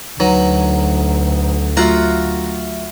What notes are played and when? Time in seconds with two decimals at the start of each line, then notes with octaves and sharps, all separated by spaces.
0.20 D2 F#3 D#4 B4 A#5
1.77 F#3 A3 F4 F#4 E5 F#5 A#5